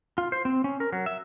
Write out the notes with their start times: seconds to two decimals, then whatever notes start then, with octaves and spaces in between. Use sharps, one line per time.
0.18 F4
0.32 C5
0.45 C4
0.64 C#4
0.80 A#4
0.93 F#3
1.06 E5